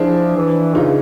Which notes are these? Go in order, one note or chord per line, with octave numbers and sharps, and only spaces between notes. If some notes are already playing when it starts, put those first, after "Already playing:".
Already playing: F3 D4 E4 G#4
E3
C#3 D#4 F4